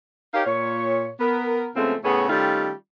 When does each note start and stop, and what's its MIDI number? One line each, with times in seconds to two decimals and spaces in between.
0.34 0.43 63
0.34 0.43 67
0.34 0.43 70
0.34 0.43 73
0.34 0.43 77
0.46 1.09 46
0.46 1.09 73
1.20 1.70 59
1.20 1.70 70
1.76 1.95 49
1.76 1.95 53
1.76 1.95 56
1.76 1.95 57
1.76 1.95 59
1.76 1.95 60
2.04 2.27 45
2.04 2.27 49
2.04 2.27 57
2.04 2.27 59
2.04 2.27 68
2.04 2.27 73
2.29 2.72 51
2.29 2.72 55
2.29 2.72 57
2.29 2.72 61
2.29 2.72 63
2.29 2.72 65